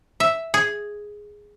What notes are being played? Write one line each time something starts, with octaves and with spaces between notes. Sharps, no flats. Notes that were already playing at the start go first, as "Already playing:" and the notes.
E5
G#4